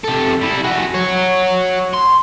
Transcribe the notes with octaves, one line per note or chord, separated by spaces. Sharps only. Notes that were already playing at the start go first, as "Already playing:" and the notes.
C3 A4
G3 E4
F#4 G#4
C#5 F#5
C6